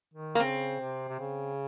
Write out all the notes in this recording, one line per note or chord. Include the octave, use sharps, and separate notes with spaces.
D#3
A#3
C#3 C4
C3
C3
C#3